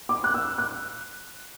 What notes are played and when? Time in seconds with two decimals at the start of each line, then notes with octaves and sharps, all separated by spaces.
0.09 D6
0.24 F#6
0.34 E6
0.58 F#6